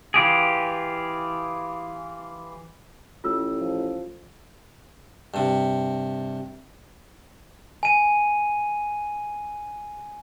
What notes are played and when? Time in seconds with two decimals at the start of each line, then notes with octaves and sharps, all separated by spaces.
0.14 E3 F4 G4 G#4
3.24 A1 F4 E6
3.59 F3
5.34 G2 C3
7.83 G#5 D#7